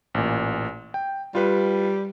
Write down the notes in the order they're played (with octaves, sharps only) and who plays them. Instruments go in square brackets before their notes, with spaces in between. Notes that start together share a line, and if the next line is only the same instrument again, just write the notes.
[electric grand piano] A1 A#2
G5
[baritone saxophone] G3 [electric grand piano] F4 B4